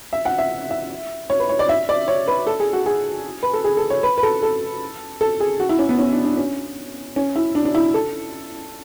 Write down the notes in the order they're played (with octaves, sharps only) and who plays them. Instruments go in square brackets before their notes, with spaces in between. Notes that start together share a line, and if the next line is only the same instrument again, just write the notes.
[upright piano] E5
F#5
E5
E5
C#5
B4
C#5
D5
E5
D5
C#5
B4
A4
G#4
F#4
G#4
B4
A4
G#4
A4
C#5
B4
B4
A4
A4
A4
G#4
F#4
E4
C#4
B3
C#4
D4
D4
C#4
C#4
E4
D4
D4
E4
A4